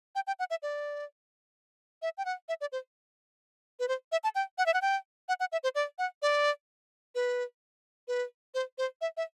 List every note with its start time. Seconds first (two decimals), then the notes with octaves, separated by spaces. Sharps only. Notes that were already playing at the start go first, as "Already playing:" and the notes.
0.15 G5
0.27 G5
0.39 F#5
0.50 E5
0.62 D5
2.02 E5
2.18 G5
2.25 F#5
2.49 E5
2.61 D5
2.72 C5
3.79 B4
3.88 C5
4.12 E5
4.24 A5
4.35 G5
4.58 F#5
4.66 E5
4.74 F#5
4.82 G5
5.29 F#5
5.40 F#5
5.52 E5
5.63 C5
5.75 D5
5.98 F#5
6.22 D5
7.15 B4
8.08 B4
8.54 C5
8.78 C5
9.01 E5
9.17 E5